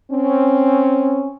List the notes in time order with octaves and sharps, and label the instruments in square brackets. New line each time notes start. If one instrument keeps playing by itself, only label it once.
[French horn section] C4 C#4